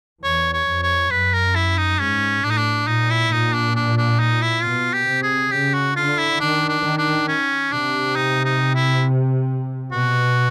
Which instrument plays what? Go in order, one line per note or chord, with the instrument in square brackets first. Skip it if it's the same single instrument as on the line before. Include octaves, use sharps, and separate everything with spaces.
[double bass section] E2 [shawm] C#5
[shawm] C#5
[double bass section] F2
[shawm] C#5
[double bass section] F#2 [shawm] B4
[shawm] A#4
E4
D#4
[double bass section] G#2 [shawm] C#4
[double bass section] A2 [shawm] D4
[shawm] D#4
D4
[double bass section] A#2 [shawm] D#4
[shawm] E4
[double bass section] A#2 [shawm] D#4
[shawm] D4
D4
D4
D#4
E4
[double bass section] B2 [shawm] F4
[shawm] G4
[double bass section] C3
[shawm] G#4
[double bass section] C#3 [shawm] G4
[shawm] F#4
[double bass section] D3 [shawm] F4
[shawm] E4
[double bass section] D#3 [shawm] D4
[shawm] D4
[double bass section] D#3
[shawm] D4
C#4
[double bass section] C3 [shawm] D4
[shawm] D#4
D#4
E4
[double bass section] B2 [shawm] F#4